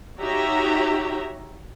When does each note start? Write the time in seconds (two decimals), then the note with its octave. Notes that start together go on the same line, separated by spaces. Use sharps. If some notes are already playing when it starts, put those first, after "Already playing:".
0.19 D#4 F#4 G4 C#5 E5 A#5